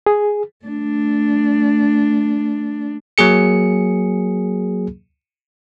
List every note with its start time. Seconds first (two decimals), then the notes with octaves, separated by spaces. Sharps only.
0.06 G#4
0.66 A3 D4
3.18 F#3 A#3 G#4 C#7